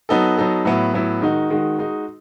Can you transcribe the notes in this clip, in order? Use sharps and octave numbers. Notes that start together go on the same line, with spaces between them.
F#3 B3 D#4 A4
F#3 B3 D#4 A4
A2 F#3 B3 E4
A2 F#3 B3 E4
D#3 G#3 D#4 F#4
D#3 G#3 D#4 F#4
G#3 D#4 F#4